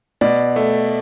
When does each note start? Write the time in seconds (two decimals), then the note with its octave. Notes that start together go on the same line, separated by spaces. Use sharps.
0.21 B2 D5
0.56 A3